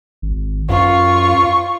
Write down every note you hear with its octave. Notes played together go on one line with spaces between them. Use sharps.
G#1
F#2 F4 C#6